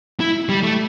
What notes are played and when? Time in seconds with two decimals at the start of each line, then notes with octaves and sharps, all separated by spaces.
0.20 E4
0.49 G3
0.63 A3